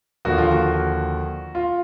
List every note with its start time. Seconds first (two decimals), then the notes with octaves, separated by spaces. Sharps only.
0.25 D#2 D3 F3 A#3 F#4
0.38 F4
0.51 F#4
1.55 F4